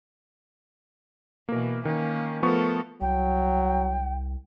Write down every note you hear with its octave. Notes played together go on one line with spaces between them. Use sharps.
B2 E3 A#3 A#4
D#3 A#3 C#4
F3 A3 B3 A4 A#4 C#6
C2 F#3 G5